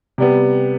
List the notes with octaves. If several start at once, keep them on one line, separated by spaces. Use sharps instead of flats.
C3 G3 B3